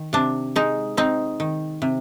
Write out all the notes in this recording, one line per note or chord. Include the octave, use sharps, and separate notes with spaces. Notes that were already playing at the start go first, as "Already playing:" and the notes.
Already playing: D#3
C3 D4
G#3 D#4
C4 D#4
D#3
C3